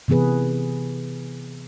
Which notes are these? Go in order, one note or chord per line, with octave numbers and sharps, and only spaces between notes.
C3 E3 B3 G#4 B4